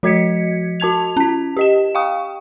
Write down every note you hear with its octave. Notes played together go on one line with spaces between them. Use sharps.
F3 F#4 D#5 G#6 B6 C#7
F#4 A5 G#6 F7
C#4 B6
G4 D#5 E7
F5 G5 C#6 D#6